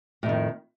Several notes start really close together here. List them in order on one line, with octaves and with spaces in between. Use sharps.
A2 F2 D#3